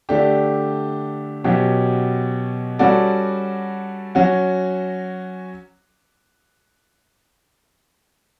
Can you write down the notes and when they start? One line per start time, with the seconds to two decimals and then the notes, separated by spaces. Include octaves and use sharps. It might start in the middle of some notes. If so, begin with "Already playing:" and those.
0.09 D3 A3 D4 G4
1.44 B2 F#3 C#4 G4
2.79 G3 C#4 F#4 A4 D5
4.15 F#3 C#4 F#4